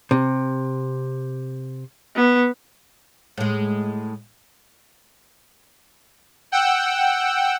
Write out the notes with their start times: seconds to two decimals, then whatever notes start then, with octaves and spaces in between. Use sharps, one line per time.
0.11 C3
2.15 B3
3.38 A2 G#3
6.52 F#5 G5 E6